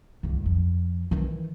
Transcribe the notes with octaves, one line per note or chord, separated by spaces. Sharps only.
C#2 G2
F2
D#3 E3